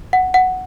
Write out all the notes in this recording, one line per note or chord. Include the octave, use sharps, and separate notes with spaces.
F#5
F#5